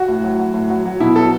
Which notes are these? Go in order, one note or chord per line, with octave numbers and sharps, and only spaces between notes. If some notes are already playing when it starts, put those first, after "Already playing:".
Already playing: F#4
A2
F#3
F#3
A2
F#3
F#3
B2 E4
F#3 A4